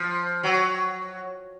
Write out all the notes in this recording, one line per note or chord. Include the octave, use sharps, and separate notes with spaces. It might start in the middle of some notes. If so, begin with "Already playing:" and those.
Already playing: F3
F#3